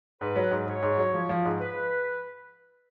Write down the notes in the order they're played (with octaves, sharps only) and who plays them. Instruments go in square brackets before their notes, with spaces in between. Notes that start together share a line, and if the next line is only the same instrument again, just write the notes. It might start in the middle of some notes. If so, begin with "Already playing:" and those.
[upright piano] G#2 [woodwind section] B4
[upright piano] F#3
G#2
[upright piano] G#2 [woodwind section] C#5
[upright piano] G#2
F#3
F3
F3
G#2
[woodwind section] B4